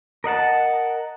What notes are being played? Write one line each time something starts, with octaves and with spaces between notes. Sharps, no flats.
A#4 D#5 F#5 A5